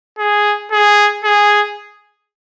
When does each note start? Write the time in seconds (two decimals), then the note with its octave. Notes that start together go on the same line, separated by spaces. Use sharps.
0.19 G#4
0.72 G#4
1.24 G#4